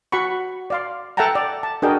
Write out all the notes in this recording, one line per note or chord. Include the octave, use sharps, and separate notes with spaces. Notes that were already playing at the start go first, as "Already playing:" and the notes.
F#4 F#5 B5 C#6
D5 F5 C6
A4 E5 F#5 G5 A5 A#5
D5
A5
D4 F#4 G#4 A#4 D#5 G5